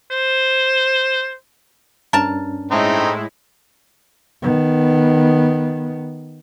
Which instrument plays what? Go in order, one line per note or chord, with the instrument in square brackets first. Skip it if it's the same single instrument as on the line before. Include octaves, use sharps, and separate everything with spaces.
[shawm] C5
[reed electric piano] G2 C#4 D4 [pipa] A#4 A5
[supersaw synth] A2 G#3 E4 [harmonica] A3 C4 D#4
[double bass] D#3 B3